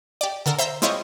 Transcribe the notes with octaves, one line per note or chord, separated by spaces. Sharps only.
G4 D5
D3 A4 A#4
C5 E5 A#5 G6
G#3 C4 E4 F4 C#5 D#5